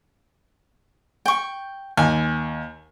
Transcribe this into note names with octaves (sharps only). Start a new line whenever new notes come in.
G5 C#6
D#2 G#5